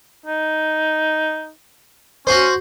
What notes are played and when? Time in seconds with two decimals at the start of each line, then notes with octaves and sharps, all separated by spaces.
0.26 D#4
2.27 C#4 F#4 C5